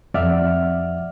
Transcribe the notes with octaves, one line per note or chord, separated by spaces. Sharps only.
F2 D5 E5 F#5 F6